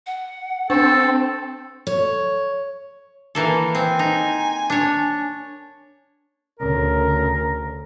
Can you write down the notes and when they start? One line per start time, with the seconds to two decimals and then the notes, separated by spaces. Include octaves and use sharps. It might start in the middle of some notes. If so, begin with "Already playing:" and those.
0.06 F#5
0.70 C4 D4 A4
1.87 C#5
3.35 E3 A#3 A4
3.75 C4 G#5
3.99 D#4
4.70 D4 C#5
6.60 D2 C#3 A#4